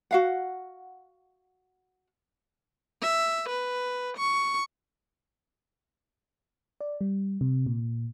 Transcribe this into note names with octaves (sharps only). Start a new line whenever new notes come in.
F#4 F5 F#5
E5
B4
C#6
D5
G3
C3
A#2